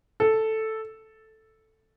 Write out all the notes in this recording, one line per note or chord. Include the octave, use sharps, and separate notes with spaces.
A4